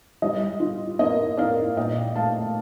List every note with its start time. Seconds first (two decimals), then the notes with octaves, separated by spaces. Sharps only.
0.22 G3 D#5
0.60 F4
0.99 A#3 D#5
1.37 A#3 D5 F5
1.77 A#2 D#5 G5
2.16 A3 F5 A5